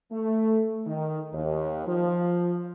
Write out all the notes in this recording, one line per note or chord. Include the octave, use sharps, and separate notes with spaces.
A3
D#3
D#2
F3